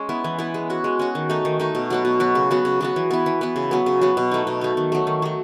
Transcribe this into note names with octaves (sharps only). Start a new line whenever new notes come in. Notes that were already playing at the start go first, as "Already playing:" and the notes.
Already playing: G#3 C#4
B3 E4
E3
B3 E4
G#3
C#4 F#4
G#3
C#4 F#4
D#3
A3 D#4
D#3
A3 D#4
B2
F#3 B3 F#4
B2
F#3 B3 F#4
C#3
F#3 B3 F#4
C#3
F#3 B3 F#4
E3
B3 E4
E3
B3 E4
C#3
F#3 B3
C#3
F#3 B3
B2
A3 D#4
B2
A3 D#4
D#3
F#3 A3
D#3
F#3 A3